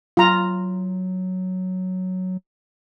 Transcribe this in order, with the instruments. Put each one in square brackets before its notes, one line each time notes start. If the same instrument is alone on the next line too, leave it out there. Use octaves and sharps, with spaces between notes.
[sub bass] F#3 [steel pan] F4 A#5